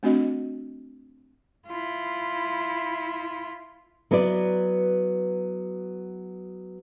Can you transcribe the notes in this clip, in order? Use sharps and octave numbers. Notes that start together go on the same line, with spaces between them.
A3 C4 D4 F#4 D#5
E4 F4
F#3 B3 E4 B4 D5